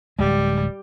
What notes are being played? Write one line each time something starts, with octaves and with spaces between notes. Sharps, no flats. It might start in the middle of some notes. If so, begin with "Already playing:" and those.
D1 G3 G#3